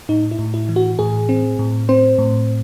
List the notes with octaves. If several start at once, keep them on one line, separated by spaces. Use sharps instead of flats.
A2 D#4
E4
A2
E4
E3
F#4
A2 G#4
C4
A2
C4 C5
A2